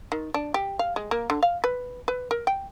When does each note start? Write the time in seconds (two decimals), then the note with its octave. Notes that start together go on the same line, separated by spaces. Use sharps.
0.12 D#3
0.34 D4
0.54 G4
0.79 F5
0.96 G#3
1.11 A#3
1.30 D3
1.43 F5
1.64 B4
2.08 B4
2.31 A#4
2.47 G5